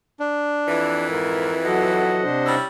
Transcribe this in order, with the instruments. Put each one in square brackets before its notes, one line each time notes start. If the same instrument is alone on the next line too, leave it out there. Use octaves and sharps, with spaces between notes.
[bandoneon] D4
[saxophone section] F2 E3
[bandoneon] G#2 [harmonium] A#4
[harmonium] F#3 F#4 A4 [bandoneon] D#5 F#5
[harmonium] C3 D4 C5
[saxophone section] G3 C#4 E4